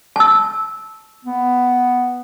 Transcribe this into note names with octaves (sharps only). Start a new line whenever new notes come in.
A5 E6
B3